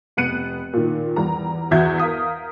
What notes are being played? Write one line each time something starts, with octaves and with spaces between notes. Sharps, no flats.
F1 B3 F#6 C#7 D#7
A#2 D#3
E2 G3 A#5
E2 F#4 E5 F#5 G6 G#6
A#4 F5 D#6 B6